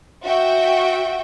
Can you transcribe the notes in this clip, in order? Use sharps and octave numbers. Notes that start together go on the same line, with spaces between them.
F#4 E5 G5